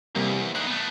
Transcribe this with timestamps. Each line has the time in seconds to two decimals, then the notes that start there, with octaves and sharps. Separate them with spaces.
0.15 E2 C3 G3 A#3
0.55 D2 D#3 B5 F#6 C7
0.67 A3 B3